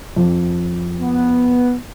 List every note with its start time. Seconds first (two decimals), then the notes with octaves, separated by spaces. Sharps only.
0.16 F2
1.01 B3